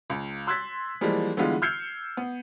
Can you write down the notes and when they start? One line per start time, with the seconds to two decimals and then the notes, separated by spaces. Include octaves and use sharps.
0.10 C#2
0.47 C6 E6 F#6 G#6 A6 B6
1.01 E3 F3 G3 G#3 A#3
1.37 D3 E3 G3 G#3 B3 F4
1.62 E6 F6 G6 G#6 C7 C#7
2.17 B3